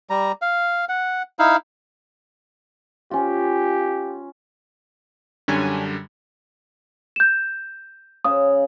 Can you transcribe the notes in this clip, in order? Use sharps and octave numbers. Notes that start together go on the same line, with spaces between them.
G3 A#5
F5
F#5
D#4 E4 F5
C#4 F4 G4
F#2 D3 G3 C#4 D4 G#5
G6 E7
C#3 F5 D#6